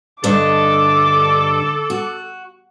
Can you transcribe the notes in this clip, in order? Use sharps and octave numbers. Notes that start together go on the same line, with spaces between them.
G2 D3 D4 A4 D#5 D6
F#4